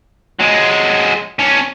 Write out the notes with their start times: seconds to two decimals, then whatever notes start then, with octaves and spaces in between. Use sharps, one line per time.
0.39 F#3 G#3
1.40 C#4 D4